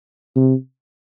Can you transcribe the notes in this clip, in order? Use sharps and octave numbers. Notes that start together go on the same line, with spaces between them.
C3